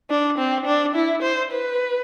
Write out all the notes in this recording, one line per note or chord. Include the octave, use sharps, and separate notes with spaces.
D4
C4
D4
E4
C5
B4